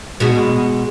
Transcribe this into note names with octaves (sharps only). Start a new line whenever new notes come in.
B2 G#3 F#4